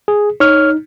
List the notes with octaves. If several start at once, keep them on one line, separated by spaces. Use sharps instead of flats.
G#4
D#4 C#5 F6